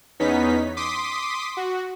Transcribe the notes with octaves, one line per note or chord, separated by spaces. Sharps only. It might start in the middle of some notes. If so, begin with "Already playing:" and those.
E2 B3 C#4 D#4 B6
C6 D6 D#6 B6
F#4